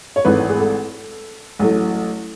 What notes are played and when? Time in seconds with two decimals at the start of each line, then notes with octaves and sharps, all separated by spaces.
0.16 C#5
0.25 G#1 G#2 E3 A3 B4
0.49 G#4
0.59 A4
1.59 A1 A2 F#3 A3